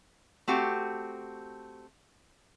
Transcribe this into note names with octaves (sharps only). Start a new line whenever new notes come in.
A3 C4 F#4 G4